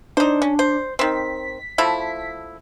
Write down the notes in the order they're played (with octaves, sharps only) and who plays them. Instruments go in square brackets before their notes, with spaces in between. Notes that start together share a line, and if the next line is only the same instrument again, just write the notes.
[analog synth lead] D4 [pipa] D#4 C5
[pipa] C#4
C5
[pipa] D#3 C4 [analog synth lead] B6
[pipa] F3 A3 E4